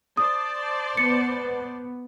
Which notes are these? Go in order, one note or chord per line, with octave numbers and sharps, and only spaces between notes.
C5 D5 A5 D#6
B3 C#7